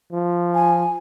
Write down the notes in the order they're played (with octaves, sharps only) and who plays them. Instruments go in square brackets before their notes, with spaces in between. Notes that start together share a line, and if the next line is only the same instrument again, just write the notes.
[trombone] F3
[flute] G#5